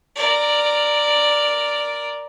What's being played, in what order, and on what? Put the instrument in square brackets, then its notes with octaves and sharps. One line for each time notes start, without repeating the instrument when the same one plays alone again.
[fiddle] A#4 D5